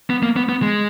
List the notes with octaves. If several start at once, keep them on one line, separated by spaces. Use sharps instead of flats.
B3
A#3
B3
B3
G#3